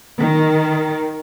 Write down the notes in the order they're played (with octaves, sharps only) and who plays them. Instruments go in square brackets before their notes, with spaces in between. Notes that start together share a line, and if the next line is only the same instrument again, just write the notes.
[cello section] D#3